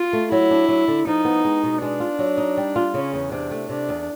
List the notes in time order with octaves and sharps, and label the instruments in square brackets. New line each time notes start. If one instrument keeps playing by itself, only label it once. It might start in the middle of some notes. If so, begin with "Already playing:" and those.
Already playing: [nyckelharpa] F4
[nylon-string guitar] A3
[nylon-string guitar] F#3 [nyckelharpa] E4
[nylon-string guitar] D4
F#3
D3
[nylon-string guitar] F3 [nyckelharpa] D#4
[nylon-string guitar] B3
G#3
B2
[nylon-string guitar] G#3 [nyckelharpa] D4
[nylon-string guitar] F4
F#3
D#4
G3
F4
[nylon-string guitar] C#3 [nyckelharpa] C#4
[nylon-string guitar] E2
[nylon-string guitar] C3 [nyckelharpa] D4
[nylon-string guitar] A3
[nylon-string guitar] C3 [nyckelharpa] D4
[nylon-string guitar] E2